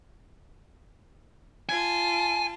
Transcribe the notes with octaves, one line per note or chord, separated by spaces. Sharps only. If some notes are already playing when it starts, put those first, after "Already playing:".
F4 G#5 A5